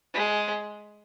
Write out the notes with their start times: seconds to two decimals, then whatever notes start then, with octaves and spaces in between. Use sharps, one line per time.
0.14 G#3